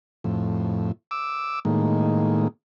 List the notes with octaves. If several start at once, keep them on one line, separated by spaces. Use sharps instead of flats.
F2 A2
D6 E6
A2 D#3 G#3 A#3